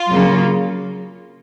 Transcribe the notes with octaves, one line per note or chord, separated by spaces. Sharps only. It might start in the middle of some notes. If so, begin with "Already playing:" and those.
Already playing: F4
C#3 F#3 A#3